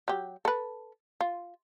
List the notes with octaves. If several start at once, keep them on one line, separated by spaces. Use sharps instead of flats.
F#3 G4
A4 B4
F4